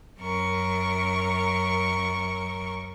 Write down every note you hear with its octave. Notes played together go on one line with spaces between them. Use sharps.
F#2 A#4 C#6